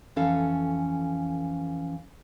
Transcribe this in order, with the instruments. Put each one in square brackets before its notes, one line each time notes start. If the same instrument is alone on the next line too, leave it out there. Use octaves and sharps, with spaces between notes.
[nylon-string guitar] F2 E3 C#4 A4 F5